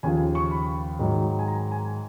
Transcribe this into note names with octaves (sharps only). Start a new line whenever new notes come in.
D#2 C#3 F3 G#5
C#6
B5
G#2 D#3 F#3
G#5
A#5
G#5